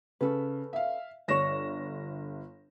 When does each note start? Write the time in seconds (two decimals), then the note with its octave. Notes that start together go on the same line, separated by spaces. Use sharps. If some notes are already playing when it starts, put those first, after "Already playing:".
0.21 C#3 C#4 A4 B4
0.73 E5 F5
1.28 G1 D4 C#5 A#6 E7